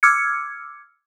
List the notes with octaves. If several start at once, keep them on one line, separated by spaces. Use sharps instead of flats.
D6 E6 F6 G#6 C#7